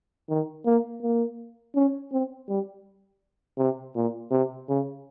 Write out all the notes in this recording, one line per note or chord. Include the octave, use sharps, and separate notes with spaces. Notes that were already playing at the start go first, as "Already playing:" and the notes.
D#3
A#3
A#3
C#4
C4
G3
C3
A#2
C3
C#3